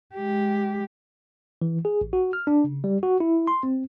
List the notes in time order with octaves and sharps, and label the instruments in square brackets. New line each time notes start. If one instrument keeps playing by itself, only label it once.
[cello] G#3 G4
[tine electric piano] E3
G#4
A1
F#4
F6
D4
C#3
G3
F#4
E4
C6
C4